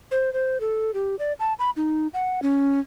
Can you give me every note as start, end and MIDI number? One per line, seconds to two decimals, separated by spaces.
0.11 0.32 72
0.33 0.60 72
0.60 0.91 69
0.94 1.16 67
1.19 1.33 74
1.40 1.53 81
1.59 1.70 83
1.77 2.08 63
2.14 2.40 78
2.42 2.80 61